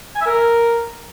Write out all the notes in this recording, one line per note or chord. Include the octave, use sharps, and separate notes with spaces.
G#5
E5
A#4